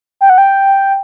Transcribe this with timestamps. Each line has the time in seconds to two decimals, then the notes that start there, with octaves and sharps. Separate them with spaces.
0.21 G5
0.30 F#5
0.38 G5